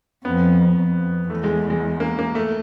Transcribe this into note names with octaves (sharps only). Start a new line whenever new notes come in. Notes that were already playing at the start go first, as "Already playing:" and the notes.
F2 B3
F2
E2 A3
G#3
G#3
A#3
A#3
A3